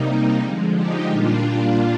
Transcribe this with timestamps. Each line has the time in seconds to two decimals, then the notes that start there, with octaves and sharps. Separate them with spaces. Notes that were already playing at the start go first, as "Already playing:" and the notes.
Already playing: C3 G3 A#3 D#4
0.40 D3 F3 G#3
0.75 D#4 G4
1.10 A#2 G3 A#3 D4 F4
1.46 D4 F4